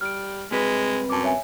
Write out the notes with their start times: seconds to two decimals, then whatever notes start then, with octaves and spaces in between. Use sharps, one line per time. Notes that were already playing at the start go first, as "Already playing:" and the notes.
0.01 G3 F6 D7
0.51 C2 C3 G#3 B4
1.10 F#2 A5 D6
1.23 C#5 E5 G#5